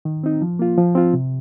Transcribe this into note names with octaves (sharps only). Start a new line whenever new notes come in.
D#3
C4 D#4
F3
A#3 F4
F3
C4 F4
C3